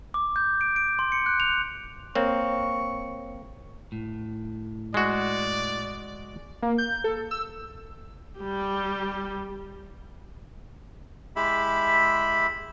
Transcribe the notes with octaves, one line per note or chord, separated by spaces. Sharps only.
D6
G6
D7
D7
C6
C#7
F#6
F7
A#3 C4 C#5 C#6
A2
G#3 F#4 D5
A#3
G6
A4
E6
G3 G4
G#3 E4 G4 E5 B5